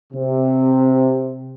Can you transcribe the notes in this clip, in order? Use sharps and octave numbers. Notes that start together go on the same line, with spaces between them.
C3